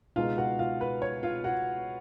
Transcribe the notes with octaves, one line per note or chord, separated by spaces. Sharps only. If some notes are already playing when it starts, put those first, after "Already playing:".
C#2 B2 G#3 D#4 F4 F5
F#4 F#5
F4 F5
B4
C#5
F4 F5
F#4 F#5